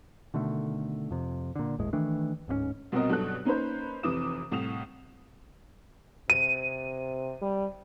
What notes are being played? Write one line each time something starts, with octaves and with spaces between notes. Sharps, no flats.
B2 D3 D#3 A3
F2 C3
A#2 D3
G#1 D#2 A2 G#3
D#3 E3 A3 D4
D1 G#2 A#3 C#4
C2 B2 C4 F#4 A#4 D#5
B1 G2 B2 A4 F#6
A#3 C#4 D#4 B4 C5
F1 C3 E3 D6 D#6 E7
C2 A2 D#6 E7 F7
C3 D#7
G3